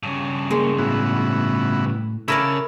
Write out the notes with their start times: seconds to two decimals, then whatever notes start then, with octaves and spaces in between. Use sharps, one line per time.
0.03 G2 C#3
0.50 G#3 A#3 C4 C#4
0.78 A2 B3 E4 F#4
2.28 C#3 E4 A4 A#4 D5 E6